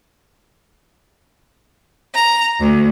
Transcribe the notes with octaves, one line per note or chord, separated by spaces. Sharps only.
A#5
D2